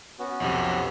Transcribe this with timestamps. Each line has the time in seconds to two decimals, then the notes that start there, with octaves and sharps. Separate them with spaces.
0.19 B3 C#4 F#4
0.40 B1 F2 C3